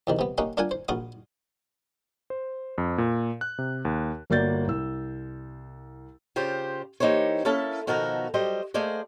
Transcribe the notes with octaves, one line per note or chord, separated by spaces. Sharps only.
E2 C3 D#3
C3 B3
A#3 C#4 D#4 G4 F#5 G5
D4 F4 A#4 F#5 G#5
C5
A#1 F4 F#4 D6 D#6
C5
F2
A#2
F#6
C3
D#2
G1 A#3 F#4 D5 G6 A6
C2 E6
C#3 F4 G4 C5 D5
E3 A#3 D#4 G4 C5 C#5
A#3 C#4 E4 A4 E5 A5
B2 D#3 F3 F#4 A4 A#4
F#3 G3 G4 C5 D#5
A3 A#3 G#4 C5 D5 D#5